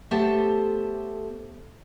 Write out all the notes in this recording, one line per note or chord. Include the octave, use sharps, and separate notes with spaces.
A3 B3 G4 A4 C5 A5